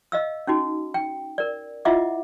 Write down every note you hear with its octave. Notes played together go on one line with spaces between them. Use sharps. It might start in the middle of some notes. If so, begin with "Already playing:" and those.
D#5 F5 E6
C#4 D#4 F#4
G5
A#4 D5
E4 F4 D#5 E5 F#5 D6